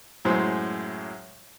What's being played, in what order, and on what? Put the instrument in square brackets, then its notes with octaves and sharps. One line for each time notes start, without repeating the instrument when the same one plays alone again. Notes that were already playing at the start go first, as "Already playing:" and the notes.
[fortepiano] F#2 A2 F#3 G#3 C5